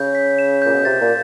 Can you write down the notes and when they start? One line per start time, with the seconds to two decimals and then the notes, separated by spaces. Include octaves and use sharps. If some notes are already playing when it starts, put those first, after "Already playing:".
Already playing: C#3 G6
0.15 B6
0.39 E7
0.62 A#2 G6
0.75 B2
0.85 C3 A6
1.00 A#2